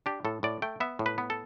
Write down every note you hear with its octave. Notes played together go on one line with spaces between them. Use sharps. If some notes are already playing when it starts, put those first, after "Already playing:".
D4 G4
A2 A4
A2 D5
A3 G5
B3 E5
A2
B4
B3
A4